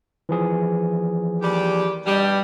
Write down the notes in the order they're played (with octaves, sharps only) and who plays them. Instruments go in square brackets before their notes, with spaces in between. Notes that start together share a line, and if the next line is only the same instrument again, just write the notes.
[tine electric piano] E3 F3 G#4
[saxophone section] D#2 G3 G4
G2 B2 G3